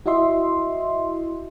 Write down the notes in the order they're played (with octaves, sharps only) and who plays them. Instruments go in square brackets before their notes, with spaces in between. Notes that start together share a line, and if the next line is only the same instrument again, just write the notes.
[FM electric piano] E4 F#4 D#5 E5 C6